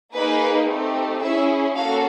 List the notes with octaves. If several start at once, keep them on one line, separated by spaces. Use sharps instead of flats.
A#3 D#4 G#4 B4
A3 C4 D#4 G4
C#4 E4 G#4 E5
A#3 C#4 F#4 A4 F5